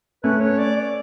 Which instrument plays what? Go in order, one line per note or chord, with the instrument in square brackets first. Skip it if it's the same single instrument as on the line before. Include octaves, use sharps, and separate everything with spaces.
[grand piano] A3 C#4 [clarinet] B4
[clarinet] C#5
D5
D5